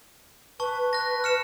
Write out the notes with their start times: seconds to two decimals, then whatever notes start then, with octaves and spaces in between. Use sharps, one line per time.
0.60 B4 A5 C#6
0.93 F#6 A#6
1.24 F6 C#7 E7